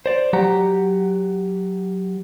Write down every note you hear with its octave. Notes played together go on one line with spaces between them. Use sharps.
C5 D5
F#3 G4 F#5 A#5